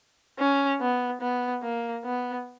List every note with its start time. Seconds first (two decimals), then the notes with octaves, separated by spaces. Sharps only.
0.39 C#4
0.81 B3
1.21 B3
1.62 A#3
2.04 B3